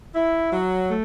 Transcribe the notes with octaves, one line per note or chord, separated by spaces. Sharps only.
E4
F#3
A3